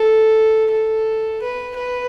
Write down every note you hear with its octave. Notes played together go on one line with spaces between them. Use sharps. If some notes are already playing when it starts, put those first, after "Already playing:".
Already playing: A4
A4
B4
B4